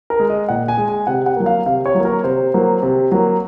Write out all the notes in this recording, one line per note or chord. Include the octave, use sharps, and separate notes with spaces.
A#4
G#3
D#5
A#2 F#5
G#5
G#3
G#5
C3 F#5
F#5
F#3 A#3
F5
C3 F5
C#5
F#3
A#3 A#4
C3 C5
F#3 A#3
C3
F#3 A#3